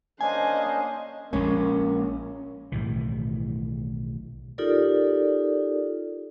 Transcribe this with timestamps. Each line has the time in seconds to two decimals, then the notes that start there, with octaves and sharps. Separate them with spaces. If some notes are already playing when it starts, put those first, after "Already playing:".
0.21 A#3 C#4 D4 C5 D#5 G#5
1.33 A#1 G#3 A#3 C#4
2.72 B1 A2 D#3 E3
4.58 D#4 F4 G4 A4 A#4 D5